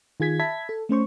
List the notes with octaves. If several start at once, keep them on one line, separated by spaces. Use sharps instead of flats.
D#3 F4 G#4 G#6 B6
E5 A5 B5 G#6 B6
A4
A3 C#4 C5 C#6